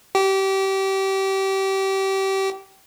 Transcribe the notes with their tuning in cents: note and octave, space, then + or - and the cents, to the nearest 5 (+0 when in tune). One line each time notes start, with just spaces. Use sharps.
G4 -25